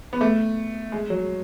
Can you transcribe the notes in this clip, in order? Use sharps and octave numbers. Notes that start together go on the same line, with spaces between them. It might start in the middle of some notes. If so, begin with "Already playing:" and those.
B3
A3
G#3
F#3